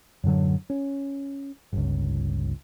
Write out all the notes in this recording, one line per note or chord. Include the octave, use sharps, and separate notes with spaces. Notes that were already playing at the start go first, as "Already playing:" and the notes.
F#2 A2 D3 F#3
C#4
G1 C#2